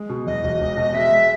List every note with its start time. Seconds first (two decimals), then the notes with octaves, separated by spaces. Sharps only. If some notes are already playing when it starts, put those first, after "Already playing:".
Already playing: G#3
0.09 B2
0.26 E2 D#5
0.43 E1
0.61 E1
0.77 B2
0.94 G#3 E5
1.12 G#3